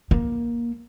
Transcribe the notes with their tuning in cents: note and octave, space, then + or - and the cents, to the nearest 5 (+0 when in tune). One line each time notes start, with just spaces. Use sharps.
A#3 +15